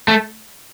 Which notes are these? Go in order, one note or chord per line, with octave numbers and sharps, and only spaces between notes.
A3